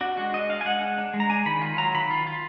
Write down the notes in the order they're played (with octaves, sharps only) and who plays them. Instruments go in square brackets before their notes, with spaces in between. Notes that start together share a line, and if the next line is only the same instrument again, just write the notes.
[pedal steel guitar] D4 F#4
G#3 F#4
D4 D#5
D4 F5
G#5
G#3 F#5
D4
D4
G#3
A#5
D4 G#5
D#3 B5
F4
F#3 A#5
D#3 B5
F4
F4